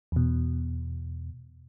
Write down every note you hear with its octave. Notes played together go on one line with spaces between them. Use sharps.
E2 B2